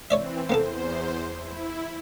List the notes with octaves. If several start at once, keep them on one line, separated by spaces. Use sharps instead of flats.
E3 C4 C#5 D5 E5
E2 A#3 B3 A4 C5
E4